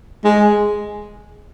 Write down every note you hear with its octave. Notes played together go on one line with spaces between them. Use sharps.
G#3